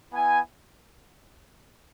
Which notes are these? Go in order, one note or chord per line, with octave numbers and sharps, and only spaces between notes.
B3 E4 G#5